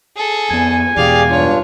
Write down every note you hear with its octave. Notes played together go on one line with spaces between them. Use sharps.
G#4 A4
F2 B3 G#5
E2 B2 G#3 G4 G#4 D5 F5
G2 D4 F4 C#5